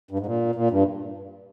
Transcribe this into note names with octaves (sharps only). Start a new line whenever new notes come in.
G2
G#2
A#2
A#2
G2